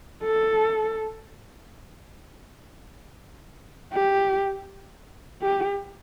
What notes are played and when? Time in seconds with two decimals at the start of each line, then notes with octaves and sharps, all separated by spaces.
0.24 A4
3.93 G4
5.42 G4